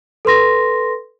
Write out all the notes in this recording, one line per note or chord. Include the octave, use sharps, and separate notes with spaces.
A4 B4 C6 A#6